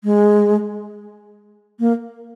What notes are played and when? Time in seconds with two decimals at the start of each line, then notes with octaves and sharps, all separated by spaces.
0.04 G#3
1.80 A#3